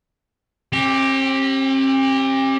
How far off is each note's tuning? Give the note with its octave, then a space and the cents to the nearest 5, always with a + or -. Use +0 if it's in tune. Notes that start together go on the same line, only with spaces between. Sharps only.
C4 +45 G4 +0